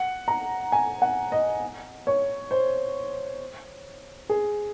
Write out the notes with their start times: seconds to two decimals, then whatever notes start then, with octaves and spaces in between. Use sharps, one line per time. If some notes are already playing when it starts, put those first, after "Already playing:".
Already playing: F#5
0.28 A#5
0.72 G#5
1.02 F#5
1.32 D#5
2.07 C#5
2.51 C5
4.30 G#4